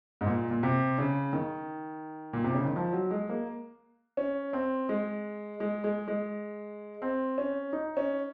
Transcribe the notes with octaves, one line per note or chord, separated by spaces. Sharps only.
G#2
A#2
A#2
C3
C#3
D#3
A#2
C3
C#3
D#3
F3
F#3
G#3
A#3
C#4
C4
G#3
G#3
G#3
G#3
C4
C#4
D#4
C#4